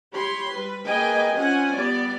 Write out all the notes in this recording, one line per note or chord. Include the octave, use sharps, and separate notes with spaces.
G4 C#5 B5 C6
G3 B4
A#3 G#4 B4 D#5 G5 G#5
C4 C#4 F4 F#5 G#5
G3 B3 D5